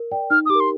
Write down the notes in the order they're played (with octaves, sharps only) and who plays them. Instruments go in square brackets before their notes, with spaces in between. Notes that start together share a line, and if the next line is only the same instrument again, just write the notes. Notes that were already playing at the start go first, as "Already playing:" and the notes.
Already playing: [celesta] A#4
D5 G5
[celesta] D#4 [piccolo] F6
[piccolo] D#6
[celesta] G4 [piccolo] D6
[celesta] A#4
[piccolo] C6